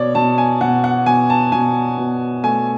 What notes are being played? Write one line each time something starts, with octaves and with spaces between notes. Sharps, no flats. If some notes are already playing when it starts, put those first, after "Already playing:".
Already playing: B2 C#5 D5
B2 A5
G#5
B2 F#5
F#5
B2 G#5
A5
B2 G#5
B2
A3 G#5